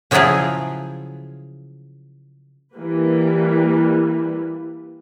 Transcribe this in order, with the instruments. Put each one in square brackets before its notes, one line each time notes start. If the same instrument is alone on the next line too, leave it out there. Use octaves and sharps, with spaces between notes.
[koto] C#3 F3 F#3 E4 F4 G#4
[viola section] E3 G3 A#3 B4